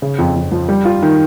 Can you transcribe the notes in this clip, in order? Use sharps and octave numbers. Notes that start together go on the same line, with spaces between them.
C#3
F2
F2
F3
G3
F4
D#3